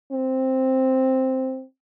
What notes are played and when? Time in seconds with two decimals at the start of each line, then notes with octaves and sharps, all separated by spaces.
0.12 C4